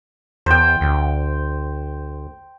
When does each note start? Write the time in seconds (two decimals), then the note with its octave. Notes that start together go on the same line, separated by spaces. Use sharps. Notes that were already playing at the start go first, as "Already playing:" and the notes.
0.46 E2 C5 G5
0.81 D2